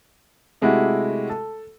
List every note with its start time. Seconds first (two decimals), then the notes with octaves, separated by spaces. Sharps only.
0.61 C3 G#3 A3 E4 F#4 G4
1.29 A4